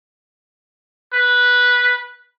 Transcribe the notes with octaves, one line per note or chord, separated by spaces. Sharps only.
B4